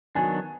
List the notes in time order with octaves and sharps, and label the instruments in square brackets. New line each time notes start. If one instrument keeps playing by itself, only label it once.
[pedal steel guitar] D#3 F#3 B3 D4 [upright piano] G#5